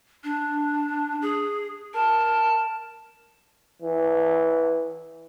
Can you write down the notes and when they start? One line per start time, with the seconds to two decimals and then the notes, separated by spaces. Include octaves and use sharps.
0.24 D4
1.22 G#4
1.94 A#4 A5
3.82 E3